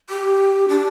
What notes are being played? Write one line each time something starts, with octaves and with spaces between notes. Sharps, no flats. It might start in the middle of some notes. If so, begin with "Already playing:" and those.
G4
D4